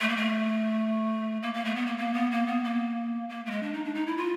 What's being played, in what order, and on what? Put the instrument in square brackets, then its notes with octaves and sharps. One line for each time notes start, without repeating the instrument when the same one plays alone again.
[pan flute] A3
A#3
A3
A#3
A#3
A3
B3
A#3
A#3
B3
A#3
B3
A#3
A#3
A3
G#3
D4
D#4
D4
D#4
E4
F4